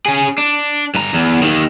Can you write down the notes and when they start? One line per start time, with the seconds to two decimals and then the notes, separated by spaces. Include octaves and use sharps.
0.06 C#4 G#4
0.38 D4
0.95 G2 A#5
1.13 E2
1.42 D#2 D#3